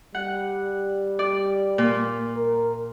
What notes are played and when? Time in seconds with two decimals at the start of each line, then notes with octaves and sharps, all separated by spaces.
0.15 G3 F#5
1.19 D5
1.78 A#2
2.35 A#4